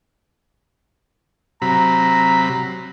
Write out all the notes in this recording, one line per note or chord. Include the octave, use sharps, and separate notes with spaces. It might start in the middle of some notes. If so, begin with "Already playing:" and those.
C3 F#3 A#5 B5